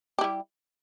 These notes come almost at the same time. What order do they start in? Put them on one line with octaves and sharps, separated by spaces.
G4 E4 G3